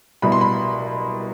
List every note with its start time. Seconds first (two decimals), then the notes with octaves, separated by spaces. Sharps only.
0.22 C2 B2 B5
0.32 C6
0.41 B5